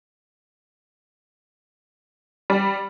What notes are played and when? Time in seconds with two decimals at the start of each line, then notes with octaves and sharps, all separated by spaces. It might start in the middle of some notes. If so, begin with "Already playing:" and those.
2.50 G3